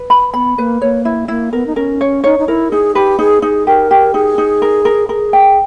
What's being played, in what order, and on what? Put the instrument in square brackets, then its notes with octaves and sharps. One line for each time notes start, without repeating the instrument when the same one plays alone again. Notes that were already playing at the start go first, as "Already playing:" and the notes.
Already playing: [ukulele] B4
B5
[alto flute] B3 [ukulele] B5
[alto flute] A#3 [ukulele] B4
[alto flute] A#3 [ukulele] C#5
[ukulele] E4
[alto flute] A#3 [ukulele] E4
[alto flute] B3 [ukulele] A#4
[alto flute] D#4
[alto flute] C#4 [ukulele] A#4
[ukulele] C#5
[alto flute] D#4 [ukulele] C#5
[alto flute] D#4
[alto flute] E4 [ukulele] A#4
[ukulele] D#4 [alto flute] G#4
[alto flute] G4 [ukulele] B4
[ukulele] D#4 [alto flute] G#4
[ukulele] D#4 [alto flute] G#4
[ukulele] G4 [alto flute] A#4
[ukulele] G4
[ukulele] D#4 [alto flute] G#4
[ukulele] D#4
A#4
A#4
[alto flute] G#4 [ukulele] A#4
[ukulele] G5